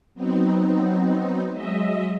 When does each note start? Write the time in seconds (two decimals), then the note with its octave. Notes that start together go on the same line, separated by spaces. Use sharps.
0.15 F#3 B3 C4 D#4
1.51 F#3 G#3 D#5 E5